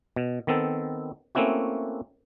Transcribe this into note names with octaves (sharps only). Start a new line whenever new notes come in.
B2
D#3 B3 C4 A4
A3 A#3 C4 C#4 E4 F#4